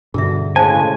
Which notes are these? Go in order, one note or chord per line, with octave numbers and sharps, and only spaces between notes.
G2 B2 D3 G#4 E5
A2 C#3 G#3 C5 F5 G#5 A5